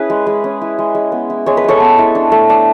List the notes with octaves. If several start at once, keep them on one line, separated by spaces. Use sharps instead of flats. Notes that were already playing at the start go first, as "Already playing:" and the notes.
Already playing: C#4 E4 G#4 B4
G#3
G#3
C#4
E4
G#3
G#3
B3
E4
G#3 C#5
B4
G#3 A4 C#5
B3
E4
D4
A3
D4